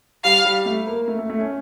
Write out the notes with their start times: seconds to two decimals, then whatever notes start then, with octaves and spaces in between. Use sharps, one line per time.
0.24 G3 F5
0.45 G3
0.66 A3
0.87 A#3
1.08 A3
1.19 A3
1.30 A3
1.40 C#4